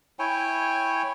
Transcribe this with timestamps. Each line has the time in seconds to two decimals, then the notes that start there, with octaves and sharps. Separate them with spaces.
0.19 E4 C#5 G5 G#5